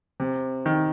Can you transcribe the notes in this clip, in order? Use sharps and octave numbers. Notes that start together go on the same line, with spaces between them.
C3
D#3